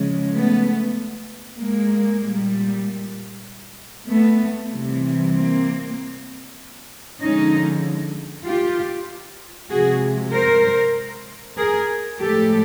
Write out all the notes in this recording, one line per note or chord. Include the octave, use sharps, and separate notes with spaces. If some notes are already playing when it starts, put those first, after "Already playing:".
Already playing: C#3 F3 G#3
A3 B3
G#3 A#3
A#2 G3
A3 B3
C3 E3 G3
A#3 C4
D3 F3 G#3 C#4 D#4
F4 G4
C3 F3 G#3 F#4 G#4
A#4 C5
G#4 A#4
A2 F3 G#3 G4 A4